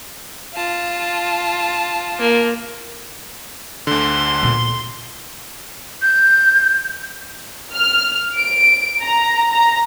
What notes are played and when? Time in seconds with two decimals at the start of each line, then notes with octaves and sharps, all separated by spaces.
0.53 F4 A5
2.19 A#3
3.87 D2 D3 C6
4.43 A#2 B3
6.02 G6
7.73 F6
8.35 D7
9.03 A#5
9.53 A#5